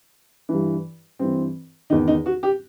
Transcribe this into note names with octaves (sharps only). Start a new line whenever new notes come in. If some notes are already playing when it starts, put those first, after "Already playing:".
G2 E3
G2 E3 C4
E2 D#3 D#4
D#4
F#4
G4